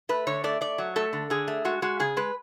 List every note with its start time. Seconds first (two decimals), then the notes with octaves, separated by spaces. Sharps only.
0.09 A3 B4
0.27 D3 C#5
0.44 A3 D5
0.61 A3 D5
0.78 F#3
0.96 A3 A4
1.13 D3
1.30 D3 G#4
1.48 A3
1.65 G#3 F#4
1.82 G#3 F#4
2.00 C#3 G#4
2.17 G#3 B4